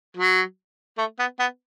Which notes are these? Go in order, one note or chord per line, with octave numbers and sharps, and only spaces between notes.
F#3
A3
B3
B3